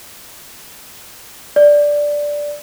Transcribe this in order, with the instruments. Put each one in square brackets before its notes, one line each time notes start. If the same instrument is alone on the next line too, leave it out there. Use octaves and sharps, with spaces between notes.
[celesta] D5